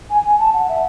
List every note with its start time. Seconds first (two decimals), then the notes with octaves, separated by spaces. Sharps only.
0.10 G#5
0.24 G#5
0.39 A5
0.54 F#5
0.69 E5